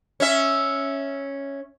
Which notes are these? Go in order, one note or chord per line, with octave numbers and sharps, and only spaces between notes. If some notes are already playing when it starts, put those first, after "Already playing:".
C#4 E5